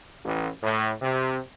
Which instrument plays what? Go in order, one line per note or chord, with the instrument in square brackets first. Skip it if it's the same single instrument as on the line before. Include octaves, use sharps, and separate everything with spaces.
[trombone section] A1
A2
C3